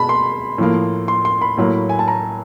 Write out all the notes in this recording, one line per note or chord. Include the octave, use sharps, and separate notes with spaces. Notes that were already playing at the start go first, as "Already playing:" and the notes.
Already playing: B2 G#3 A5 B5
C6
A2 F3 A#3
C6
C6
B5
A2 F#3 A#3
G#5
A5
A#5